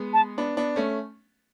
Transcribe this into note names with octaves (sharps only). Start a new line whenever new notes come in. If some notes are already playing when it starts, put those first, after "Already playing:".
Already playing: G#3 B3
A5
B3 D4
B3 D4
A3 C#4